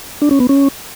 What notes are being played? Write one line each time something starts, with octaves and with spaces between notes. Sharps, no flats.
D4
C#4
B3
C#4